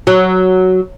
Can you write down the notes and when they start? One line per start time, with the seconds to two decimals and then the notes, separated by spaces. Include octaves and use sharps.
0.07 F#3